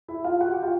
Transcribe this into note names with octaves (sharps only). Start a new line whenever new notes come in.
E4 E5
F4 F5
F#4 F#5
G4 G5
F4 F5